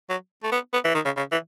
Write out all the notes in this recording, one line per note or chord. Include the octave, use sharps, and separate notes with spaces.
F#3
A3
B3
B3
E3
D#3
C#3
C#3
E3